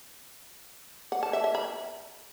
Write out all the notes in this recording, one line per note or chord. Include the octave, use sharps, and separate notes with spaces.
F#5
A5
E5
E5
B5